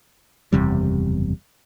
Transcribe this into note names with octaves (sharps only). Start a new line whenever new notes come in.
F#1 E2 C3 G3